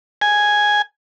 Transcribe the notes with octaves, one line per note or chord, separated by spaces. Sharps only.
G#5